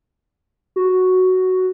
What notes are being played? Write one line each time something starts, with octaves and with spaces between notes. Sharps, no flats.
F#4